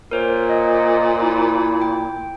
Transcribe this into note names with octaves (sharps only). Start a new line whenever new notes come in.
A#2 A#4 C5 C#5
D#5
E4
G5